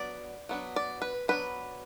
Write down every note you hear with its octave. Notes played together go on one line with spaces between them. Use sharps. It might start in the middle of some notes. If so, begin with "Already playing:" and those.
Already playing: F#3 B3 D4 D5
F#3 B3 D4
D5
B4
F#3 B3 D4 B4